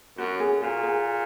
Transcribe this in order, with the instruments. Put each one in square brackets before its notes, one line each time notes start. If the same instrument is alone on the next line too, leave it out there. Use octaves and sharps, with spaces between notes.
[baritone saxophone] F#2 [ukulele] F#4
[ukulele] G#4
[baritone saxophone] A#2 [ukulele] F#4
[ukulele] G#4